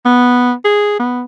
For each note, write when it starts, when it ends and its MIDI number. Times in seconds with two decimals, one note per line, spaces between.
0.05 0.53 59
0.65 0.96 68
0.99 1.23 59